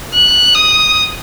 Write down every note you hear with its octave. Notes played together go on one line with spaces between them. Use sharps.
F#6
D#6